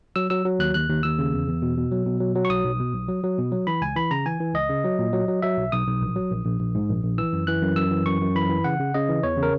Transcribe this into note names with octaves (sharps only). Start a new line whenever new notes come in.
F#3 E6
F#3 E6
F#3
D#2 F#6
D#2 F#6
D#2
D#2 E6
C#3
E2
E2
B2
B2
F#3
B2
F#3
F#3
C#6
B1 D#6
B1
B2
B1
F#3
F#3
B2
F#3
E3 B5
C#2 G#5
E3 B5
C#3 A#5
E3 G#5
E3
C#2 D#5
C#3
F#3
A#2
F#3
F#3
F#3 E5
B1
B1 D#6
B1
A#1
F#3
A#1
A#1
A#1
G#2
A#1
A#1
E3 E6
F#2
E3 F#6
F#2
F#2 E6
E3
F#2 C#6
F#2
E3 B5
E3
C#3 F#5
C#3
C#3 D#5
E3
E2 C#5
C#3
A#4